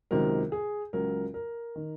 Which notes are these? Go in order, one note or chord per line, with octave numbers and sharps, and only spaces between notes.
C#2 C3 D#3 F#3 A#4
G#4
C#2 C#3 F#3 A#4
A#4
D#3